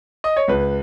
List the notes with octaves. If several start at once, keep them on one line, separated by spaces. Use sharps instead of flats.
D#5
C#5
C#2 B4